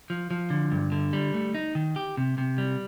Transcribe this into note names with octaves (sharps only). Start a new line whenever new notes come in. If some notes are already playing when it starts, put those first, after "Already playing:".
F3
F3
D3
G2
D3
G3
A3
D#4
D#3
G4
C3
C3
G3